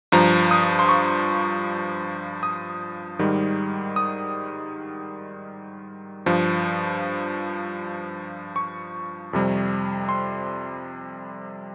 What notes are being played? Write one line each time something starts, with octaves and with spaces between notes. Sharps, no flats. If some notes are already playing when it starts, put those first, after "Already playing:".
G2 F3 A#5
D#6
C6
C#6
D#6
G#2 D#3 G3
D#6
G2 F3
C#6
F2 C3 G3
C6